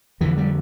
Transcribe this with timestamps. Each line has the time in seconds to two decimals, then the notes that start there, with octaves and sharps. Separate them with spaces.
0.21 F2 D3 E3
0.38 G3